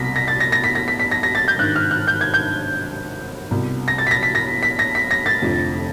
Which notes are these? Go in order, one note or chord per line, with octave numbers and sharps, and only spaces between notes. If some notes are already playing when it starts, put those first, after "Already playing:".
Already playing: C2 B2 A#6 B6
A#6
A6
A#6
A#6
B6
A#6
B6
B6
A#6
A#6
A6
G6
G#1 G2 D#3 F#6
F6
F#6
G6
G#6
G6
C2 B2
A#6
A6
B6
A#6
B6
A#6
B6
A#6
B6
A#6
A6
F1 F2 D3